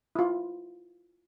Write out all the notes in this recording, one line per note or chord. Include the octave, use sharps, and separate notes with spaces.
E4 F4